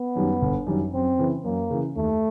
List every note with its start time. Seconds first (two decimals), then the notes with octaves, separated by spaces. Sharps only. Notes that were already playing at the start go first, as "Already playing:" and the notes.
Already playing: B3
0.16 F#2 D#3 G3
0.42 G1
0.67 F#2 D#3 G3
0.93 F#2 C4
1.19 C#3 E3
1.44 F#2 A#3
1.70 C#3 E3
1.96 D#2 A3